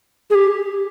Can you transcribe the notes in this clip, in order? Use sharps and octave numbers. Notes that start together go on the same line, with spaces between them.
G#4
G4